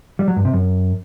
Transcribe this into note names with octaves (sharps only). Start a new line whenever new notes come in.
G3
F#3
G2
C3
F#2